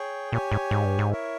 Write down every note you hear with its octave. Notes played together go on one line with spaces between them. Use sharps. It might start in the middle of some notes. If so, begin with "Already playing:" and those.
Already playing: G#4 C#5 G5
A#2 G4 C#5 G#5
G#2
G#2
G2
G#2
E4 A#4 C#5 E5